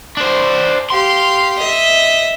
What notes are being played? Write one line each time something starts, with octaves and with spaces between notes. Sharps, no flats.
D4 C5
G4 F5 C6
D#5 E5